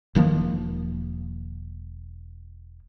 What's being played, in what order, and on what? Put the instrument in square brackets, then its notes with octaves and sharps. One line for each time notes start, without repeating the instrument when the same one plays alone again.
[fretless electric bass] E1 D#3 F3 A#3